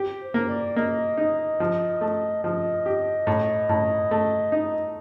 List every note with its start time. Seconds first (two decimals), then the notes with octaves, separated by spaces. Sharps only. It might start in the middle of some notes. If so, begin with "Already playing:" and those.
Already playing: G4
0.20 C5
0.34 A#3
0.48 D5
0.76 A#3 D#5
1.17 D#4
1.60 F3
2.01 A3
2.43 F3 D#5
2.86 G4
3.27 A2
3.69 A2
4.11 A3
4.52 D#4